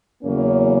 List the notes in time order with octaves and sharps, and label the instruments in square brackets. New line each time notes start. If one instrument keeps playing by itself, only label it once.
[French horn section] E2 C#3 F#3 A#3 C#4